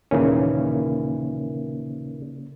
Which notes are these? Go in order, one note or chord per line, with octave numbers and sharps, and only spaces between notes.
D#2 A#2 C#3 E3 A#3 C#4